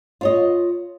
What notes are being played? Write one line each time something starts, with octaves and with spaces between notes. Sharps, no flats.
F4 C#5 D#5